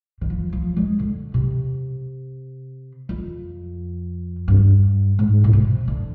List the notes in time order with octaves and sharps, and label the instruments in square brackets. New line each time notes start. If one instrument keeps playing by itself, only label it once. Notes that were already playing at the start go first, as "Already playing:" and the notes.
[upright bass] D#3
F3
F3
G#3
D3
C3
F2
G2
G#2
A#2
C3
D3